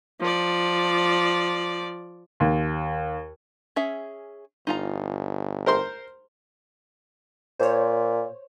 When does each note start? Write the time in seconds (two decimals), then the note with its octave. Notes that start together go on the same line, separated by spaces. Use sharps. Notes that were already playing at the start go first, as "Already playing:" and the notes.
0.21 F3 D5
2.40 D#2
3.76 C#4 G#4 E5
4.67 G1 D#4 F4 A#5
5.66 A#4 C5 C6
7.60 A#2 C5 C#5